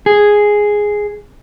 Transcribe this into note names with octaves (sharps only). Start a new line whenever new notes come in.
G#4